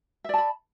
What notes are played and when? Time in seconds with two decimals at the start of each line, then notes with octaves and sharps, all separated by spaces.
0.24 E5
0.29 D5
0.34 A5
0.38 B5